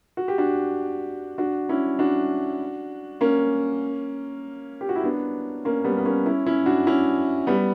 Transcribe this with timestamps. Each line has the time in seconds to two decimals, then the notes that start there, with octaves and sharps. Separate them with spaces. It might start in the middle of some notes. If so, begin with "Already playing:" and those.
0.17 F#4
0.28 G4
0.38 D4 F#4
1.38 D4 F#4
1.69 C#4 E4
1.99 D4 F#4
3.21 A#3 C#4
4.81 G4
4.89 F#4
4.96 E4
5.04 B3 D4
5.65 A#3 C#4
5.84 G3 B3
5.98 B3
6.06 A#3 C#4
6.26 C#4 E4
6.46 C#4 E4
6.66 D4 F#4
6.87 C#4 E4
7.47 G3 B3